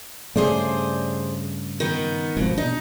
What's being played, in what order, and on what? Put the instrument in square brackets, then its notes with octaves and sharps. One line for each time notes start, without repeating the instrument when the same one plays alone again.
[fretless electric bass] G2 C#3 A3 [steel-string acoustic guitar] G#4 C5 D5
[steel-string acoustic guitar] D#3 B3
[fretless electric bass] G#1 F3 [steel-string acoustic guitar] B2
[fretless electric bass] B2 D4 [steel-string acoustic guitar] D#4